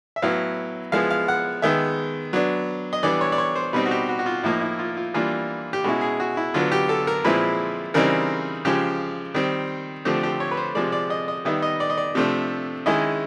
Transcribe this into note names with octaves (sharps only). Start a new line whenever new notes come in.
E5
A2 F#3 B3 E4 F5
F3 G#3 B3 E4 F5
F5
F#5
D#3 G#3 B3 E5
F#3 B3 D4
D#5
E3 G3 B3 D4 D5
C#5
D5
C#5
C5
B2 G3 C4 D#4 B4
F#4
G4
F#4
F#4
F4
A2 F3 A#3 D#4 E4
E4
F4
F4
E3 G3 A#3 D4 F4
G4
B2 G#3 C#4 E4 F#4
G#4
F#4
E4
D3 F#3 B3 F4
G4
A4
A#4
A#2 F3 G#3 C4 E4 B4
C#3 E3 G3 C4 D#4 A#4
C#3 F3 G#3 G4
D#3 G3 C4
D3 F3 A3 C4 G4
G4
C#5
B4
C5
C3 F3 G#3 D5
D5
D#5
D#5
D#3 G3 B3 D#4 E5
D#5
D5
D#5
D5
C3 F3 A3 D4
D#3 G#3 C#4 E4 D#5